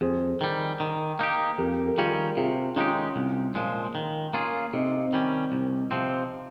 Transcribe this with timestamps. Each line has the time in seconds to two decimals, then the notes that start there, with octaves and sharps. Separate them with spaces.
0.01 F2 G#4 C5
0.41 D#3 G3
0.80 D#3
1.19 A#3 D#4 G4
1.58 F2 G4 A#4
1.87 A#4
1.98 D#3 G3 A#3 C#4 F4 G#4
2.37 C3 F4 G#4
2.76 D#3 G#3 C#4 D#4 F4 G4
3.16 C2
3.55 A#2 F3 G#3
3.95 D#3
4.33 A#3 C#4 F4 G#4
4.73 C3 C4 D#4
5.13 D#3 G3 C#4
5.52 C2
5.91 C3 F3 C4